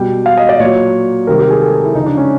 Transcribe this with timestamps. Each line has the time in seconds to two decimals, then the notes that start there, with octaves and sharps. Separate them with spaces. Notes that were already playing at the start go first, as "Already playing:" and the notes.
Already playing: B2 G3 G5
0.26 F5
0.37 D#5
0.49 D5
0.60 A#2 F#3 C#5
1.27 C3 D#3 G3 A#4
1.39 G4
1.50 G#4
1.61 A4
1.72 G#4
1.84 E4
1.95 C#3 F3 D#4
2.06 D4
2.17 C#4